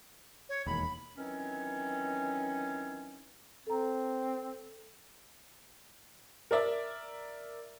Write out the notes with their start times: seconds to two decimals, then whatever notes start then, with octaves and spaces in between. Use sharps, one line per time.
0.49 C#5
0.66 E1 D#2 B5
1.17 D#3 E3 F#3 C4 C#4
3.67 C4 A4 A#5
6.51 A#4 D5 E5